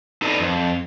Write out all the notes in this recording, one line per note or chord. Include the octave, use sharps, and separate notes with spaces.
D#4 A4 B4 D5 D#5
F2